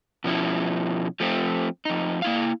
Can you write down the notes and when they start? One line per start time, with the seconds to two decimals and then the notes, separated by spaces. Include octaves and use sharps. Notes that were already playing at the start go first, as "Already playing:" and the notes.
0.24 B2 F3 C#4 E4
1.20 F3 A3 C4
1.85 F2 D#4
2.22 A#3 E4 F5